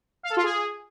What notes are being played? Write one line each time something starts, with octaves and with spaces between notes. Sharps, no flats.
F5
A4
F4
G#4